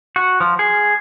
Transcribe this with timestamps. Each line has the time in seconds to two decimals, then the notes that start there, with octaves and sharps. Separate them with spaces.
0.16 F#4
0.40 F3
0.59 G#4